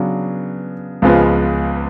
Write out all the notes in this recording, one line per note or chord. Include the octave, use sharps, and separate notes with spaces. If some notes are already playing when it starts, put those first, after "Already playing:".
Already playing: C#3 F#3 B3 D4
C#2 C#3 F3 G#3 B3